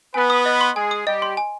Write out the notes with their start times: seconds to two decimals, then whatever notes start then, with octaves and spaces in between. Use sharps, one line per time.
0.14 B3 B4 G#5
0.30 D#6
0.46 D#5
0.61 C6
0.76 G#3 G#4 G#5
0.91 D#6
1.07 G3 G4 D#5
1.22 C6
1.37 G#5